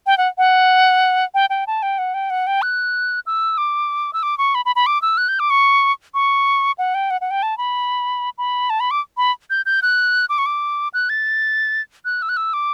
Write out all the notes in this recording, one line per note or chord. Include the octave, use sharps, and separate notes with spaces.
G5
F#5
F#5
G5
G5
A5
G5
F#5
G5
F#5
G5
F#6
E6
D6
E6
D6
C#6
B5
B5
B5
D6
E6
F#6
G6
D6
C#6
C#6
F#5
G5
F#5
F#5
G5
A5
B5
B5
A5
B5
D6
B5
G6
G6
F#6
D6
C#6
D6
F#6
A6
F#6
E6
F#6
E6
D6